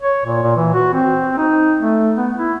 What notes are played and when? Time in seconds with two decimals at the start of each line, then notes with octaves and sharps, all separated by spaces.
0.02 C#5
0.26 A#2
0.43 A#2
0.57 E3
0.74 F#4
0.93 C4
1.38 D#4
1.80 A3
2.17 B3
2.37 E4